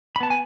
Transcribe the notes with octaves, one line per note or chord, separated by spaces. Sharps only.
B5
B3 A5
G#5